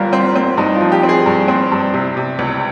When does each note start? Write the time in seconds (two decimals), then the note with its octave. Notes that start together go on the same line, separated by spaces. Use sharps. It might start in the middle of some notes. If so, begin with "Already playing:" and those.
Already playing: G1 G2 G3 F4 A#4
0.13 C4
0.35 C4
0.58 G2 D#4
0.75 F4
0.80 F3
0.92 G4
1.03 C4
1.09 G#4
1.26 G2
1.48 C4
1.72 G2
1.94 C3
2.17 C3
2.39 C#2